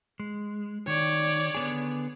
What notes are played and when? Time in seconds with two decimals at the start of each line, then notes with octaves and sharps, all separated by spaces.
0.20 G#3
0.87 D#3 C#5 D5
1.55 D3 B3 G#4